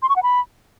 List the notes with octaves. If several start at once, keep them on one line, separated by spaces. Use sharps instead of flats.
C6
C#6
F#5
B5